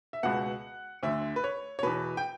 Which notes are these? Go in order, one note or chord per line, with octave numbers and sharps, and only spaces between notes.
E5
C#2 B2 F#5
D2 D3 E5
B4
C#5
C#5
E2 B2 B4
G5